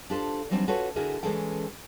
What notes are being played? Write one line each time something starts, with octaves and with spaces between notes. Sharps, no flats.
D4 F4 G4 A4 C5
E3 F#3 G3 C4 D4 D#4
C#4 F4 F#4 A4 B4 C#5
D3 E4 F#4 G#4 A#4
E3 G#3 C#4 G#4 A4 G5